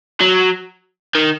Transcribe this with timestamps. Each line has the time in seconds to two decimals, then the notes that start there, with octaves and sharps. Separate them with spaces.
0.21 F#3
1.15 D#3